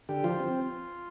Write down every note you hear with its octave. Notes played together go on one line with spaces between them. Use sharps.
D3 G4
F3 F4
C4